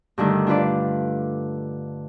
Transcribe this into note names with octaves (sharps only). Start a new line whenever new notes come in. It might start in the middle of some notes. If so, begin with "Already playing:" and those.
G2 D3 D#3 A3
D4 F4 B4 D5